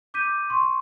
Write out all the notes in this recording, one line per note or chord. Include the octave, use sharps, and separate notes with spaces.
D6 G6 B6 D#7
C6 C#6